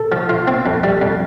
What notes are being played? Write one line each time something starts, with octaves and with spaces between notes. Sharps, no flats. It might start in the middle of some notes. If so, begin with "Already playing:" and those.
Already playing: A4
F3
F4
C4
F2
G3
F2